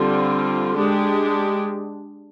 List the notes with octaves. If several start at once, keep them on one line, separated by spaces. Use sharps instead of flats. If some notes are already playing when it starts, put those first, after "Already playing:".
Already playing: D3 G3 C4 F4
G#3 D4 G4